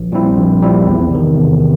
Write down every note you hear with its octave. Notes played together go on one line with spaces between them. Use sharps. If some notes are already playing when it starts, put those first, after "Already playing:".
Already playing: A#1
A#2 G3 C4 E4
A#1
A#2 G3 C4 E4
E2
C3 D#3
E2
C3